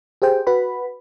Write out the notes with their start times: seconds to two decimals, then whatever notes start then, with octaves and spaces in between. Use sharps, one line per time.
0.22 G4 G#4 C5 G5
0.47 F#4 B4 B5